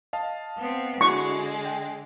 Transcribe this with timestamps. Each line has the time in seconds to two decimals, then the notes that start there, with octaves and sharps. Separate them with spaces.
0.13 D#5 F5 A5
0.57 B3 C4
1.01 D3 G#3 D4 E4 F#4 C#6
1.65 G5